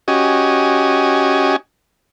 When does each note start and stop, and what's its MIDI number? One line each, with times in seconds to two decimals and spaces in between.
0.08 1.56 61
0.08 1.56 66
0.08 1.56 67
0.08 1.56 75
0.08 1.56 80